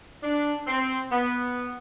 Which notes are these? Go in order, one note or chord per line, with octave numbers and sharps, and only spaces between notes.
D4
C4
B3